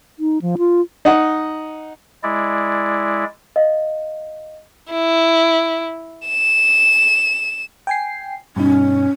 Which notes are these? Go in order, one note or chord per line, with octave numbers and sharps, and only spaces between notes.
D#4
F3
F4
D#4 D#5 F#5
G#3 E4 D5
D#5 F5
E4
E7
G5 G#5 C7
G2 B2 C#4 D#4